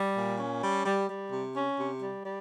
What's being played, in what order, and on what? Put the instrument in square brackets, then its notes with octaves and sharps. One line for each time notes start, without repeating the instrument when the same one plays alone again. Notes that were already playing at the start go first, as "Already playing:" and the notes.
Already playing: [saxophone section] G3
A#2
C#4
G3
G3
G3
C3
C#4
C3
G3
G3